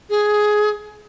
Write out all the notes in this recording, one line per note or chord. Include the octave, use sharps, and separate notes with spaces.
G#4